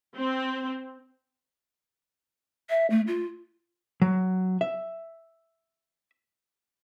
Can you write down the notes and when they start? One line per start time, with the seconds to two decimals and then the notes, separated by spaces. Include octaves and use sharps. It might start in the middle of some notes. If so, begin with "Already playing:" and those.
0.16 C4
2.69 E5
2.90 A3
3.07 F4
4.02 F#3
4.61 E5